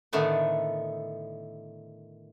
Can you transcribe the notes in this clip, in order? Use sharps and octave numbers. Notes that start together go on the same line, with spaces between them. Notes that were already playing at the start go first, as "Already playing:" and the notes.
A2 D3 D#3 A3 B3